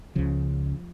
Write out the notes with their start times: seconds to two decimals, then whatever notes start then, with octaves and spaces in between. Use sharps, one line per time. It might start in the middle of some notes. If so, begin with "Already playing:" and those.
0.16 C#2 C#3 F3